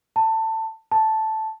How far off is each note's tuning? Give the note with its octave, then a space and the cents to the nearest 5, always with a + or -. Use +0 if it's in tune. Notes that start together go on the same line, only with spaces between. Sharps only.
A5 +20
A5 -5